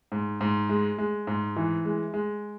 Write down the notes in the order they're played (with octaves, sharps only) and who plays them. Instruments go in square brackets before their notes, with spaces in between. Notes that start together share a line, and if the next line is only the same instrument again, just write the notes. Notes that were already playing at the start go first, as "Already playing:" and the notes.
[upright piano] G#2
G#2
G#3
G#3
G#2
E3
G#3
G#3